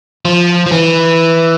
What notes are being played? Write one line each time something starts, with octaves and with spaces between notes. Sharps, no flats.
F3
F3
E3